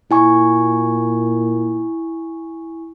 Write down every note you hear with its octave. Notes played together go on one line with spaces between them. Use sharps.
A#2 E4 G#5 C#6